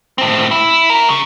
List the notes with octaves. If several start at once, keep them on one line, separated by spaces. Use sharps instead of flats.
A2 C4
E4
F#4 A#4
C#3